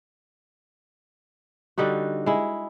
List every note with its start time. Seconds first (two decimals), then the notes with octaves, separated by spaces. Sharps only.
1.78 D3 G3 D#4 F#4
2.26 G#3 E4